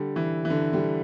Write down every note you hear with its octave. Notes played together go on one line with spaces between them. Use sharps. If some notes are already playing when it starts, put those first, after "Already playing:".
Already playing: D3 G3
E3
E3
D3
D3 G3